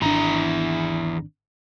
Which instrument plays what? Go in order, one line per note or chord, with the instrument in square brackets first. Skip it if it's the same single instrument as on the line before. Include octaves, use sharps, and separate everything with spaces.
[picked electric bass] G#1 D4 [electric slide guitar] E2 E4 A#5